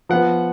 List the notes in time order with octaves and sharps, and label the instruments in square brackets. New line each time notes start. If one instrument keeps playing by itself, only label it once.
[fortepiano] F3 B3 F#5